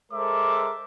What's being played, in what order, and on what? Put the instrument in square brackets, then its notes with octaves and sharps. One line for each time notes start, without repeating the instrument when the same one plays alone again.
[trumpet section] G#3 A4 A#4 C5 E5 D6